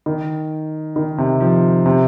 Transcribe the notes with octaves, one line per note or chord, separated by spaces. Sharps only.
D#3
D#3
C3
F3
C3